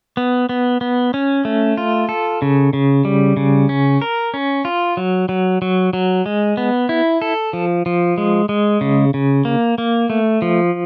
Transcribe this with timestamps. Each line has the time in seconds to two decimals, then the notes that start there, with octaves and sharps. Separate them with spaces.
0.17 B3
0.49 B3
0.81 B3
1.14 C#4
1.45 A3
1.77 F4
2.09 A4
2.42 C#3
2.73 C#3
3.05 G3
3.37 C#3
3.69 C#4
4.02 A#4
4.34 C#4
4.65 F4
4.97 F#3
5.29 F#3
5.62 F#3
5.93 F#3
6.26 G#3
6.57 B3
6.89 E4
7.22 A4
7.53 F3
7.86 F3
8.18 G#3
8.49 G#3
8.81 C#3
9.14 C#3
9.45 A#3
9.78 A#3
10.10 A3
10.42 F3